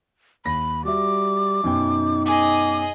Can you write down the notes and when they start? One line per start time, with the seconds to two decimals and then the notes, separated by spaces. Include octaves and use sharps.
0.45 D#2 B5 A#6
0.85 G3 F#4 E5 D6
1.64 F#2 B2 D#4 G5
2.26 G#4 D#5 D6